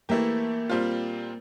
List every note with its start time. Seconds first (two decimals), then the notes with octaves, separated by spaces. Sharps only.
0.09 E3 A3 A#3 E4 G4
0.70 A#2 G3 C4 F4